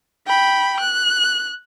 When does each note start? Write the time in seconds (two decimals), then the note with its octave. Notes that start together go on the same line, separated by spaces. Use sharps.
0.27 G5 B5
0.80 F#6